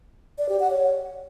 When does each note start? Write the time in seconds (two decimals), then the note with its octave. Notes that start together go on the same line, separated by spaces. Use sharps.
0.38 D5
0.49 G4
0.60 F#5
0.70 C#5